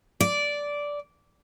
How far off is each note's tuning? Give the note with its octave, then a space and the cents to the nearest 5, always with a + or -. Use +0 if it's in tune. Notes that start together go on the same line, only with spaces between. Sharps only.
D5 -10